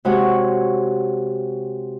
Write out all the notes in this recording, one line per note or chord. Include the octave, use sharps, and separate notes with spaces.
C3 G#3 F#4 C#5 F#5